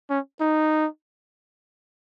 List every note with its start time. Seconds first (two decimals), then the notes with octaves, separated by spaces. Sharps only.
0.10 C#4
0.41 D#4